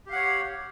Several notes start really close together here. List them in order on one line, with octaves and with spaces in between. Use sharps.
G4 F5 F#5 C#5